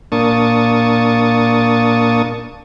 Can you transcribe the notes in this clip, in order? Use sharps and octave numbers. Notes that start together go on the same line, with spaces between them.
A#2 A#3 D4 A5 C#6 D#6